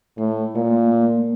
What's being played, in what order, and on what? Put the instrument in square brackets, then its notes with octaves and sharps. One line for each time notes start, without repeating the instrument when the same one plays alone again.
[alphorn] A2 [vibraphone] A3
[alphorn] A#2 [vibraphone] A#3